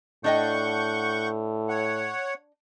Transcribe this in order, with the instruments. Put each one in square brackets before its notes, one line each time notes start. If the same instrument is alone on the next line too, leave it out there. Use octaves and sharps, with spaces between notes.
[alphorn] A2 [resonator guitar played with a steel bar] D4 D#5 G5 [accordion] F#5 C#6 G6
[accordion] C#5 F#5